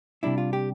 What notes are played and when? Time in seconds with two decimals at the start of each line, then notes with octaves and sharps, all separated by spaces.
0.23 C3 G3 D4 E4
0.38 F4
0.53 G4